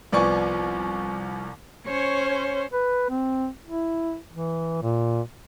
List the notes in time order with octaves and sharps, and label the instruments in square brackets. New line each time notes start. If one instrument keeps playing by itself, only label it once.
[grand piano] C2 F3 B3 D5 G#5 C#6
[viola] C#4 C5 [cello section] C#5
[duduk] B4
C4
E4
E3
A#2